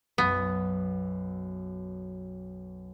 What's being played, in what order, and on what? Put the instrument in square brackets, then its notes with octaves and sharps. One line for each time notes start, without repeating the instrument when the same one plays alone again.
[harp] B1 F#2 [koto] B3